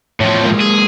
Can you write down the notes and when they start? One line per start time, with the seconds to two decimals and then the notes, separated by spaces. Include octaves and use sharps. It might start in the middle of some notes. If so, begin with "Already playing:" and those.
0.20 E2 A2 F3 C#5
0.43 G#3 A#3
0.60 G#4